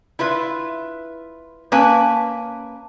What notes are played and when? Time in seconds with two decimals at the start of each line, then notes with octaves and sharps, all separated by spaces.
0.19 E4 F4 B4 E5
1.72 A#3 C#4 B4 G#5 A5